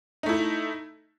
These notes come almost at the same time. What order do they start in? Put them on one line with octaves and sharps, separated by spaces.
D#4 A3 E4